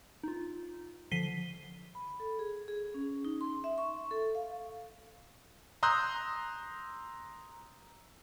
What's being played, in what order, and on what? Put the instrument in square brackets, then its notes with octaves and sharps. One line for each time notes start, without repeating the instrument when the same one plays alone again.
[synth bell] D#4 F4
D3 F3 B6 C7 D#7 G7
[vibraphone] B5
A4
G#4
G#4
C#4
D#4
C6
E5
C#6
A4
F5
[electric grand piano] A#5 C6 D#6 E6 F#6 G6